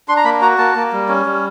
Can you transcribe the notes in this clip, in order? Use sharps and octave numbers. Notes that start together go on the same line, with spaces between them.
D4 C6
A#5
A#3 B5
F#4 A#5
A#3 A5
A#3
G3
C#4
G3